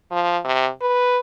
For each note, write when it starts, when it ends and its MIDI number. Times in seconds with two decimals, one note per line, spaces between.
0.12 0.38 53
0.44 0.69 48
0.81 1.19 71